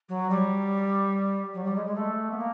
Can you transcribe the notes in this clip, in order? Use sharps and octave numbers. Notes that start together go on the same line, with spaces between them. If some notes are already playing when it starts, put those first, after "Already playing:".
F#3
G3
F#3
G3
G#3
G#3
A3
B3
A#3